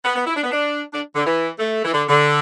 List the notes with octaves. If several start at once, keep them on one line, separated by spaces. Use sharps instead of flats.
B3
B3
E4
D4
B3
D4
D4
D3
E3
A3
E3
D3
D3